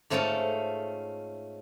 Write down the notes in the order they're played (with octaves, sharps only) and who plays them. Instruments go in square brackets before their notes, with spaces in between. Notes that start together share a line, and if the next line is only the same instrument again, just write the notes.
[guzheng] G#2 A3 C#4 F4 G5 A5